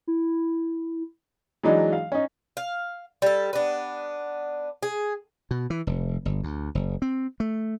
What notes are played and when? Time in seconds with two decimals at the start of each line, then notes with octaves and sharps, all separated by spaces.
0.07 E4
1.63 E3 F#3 G#3 D4 D#4
1.93 F5
2.12 C#4 D#4
2.57 F5
3.22 G3 A4
3.53 B3 D4
4.83 G#4
5.51 B2
5.70 E3
5.87 F1
6.25 G1
6.43 D2
6.75 F#1
7.02 C4
7.40 A3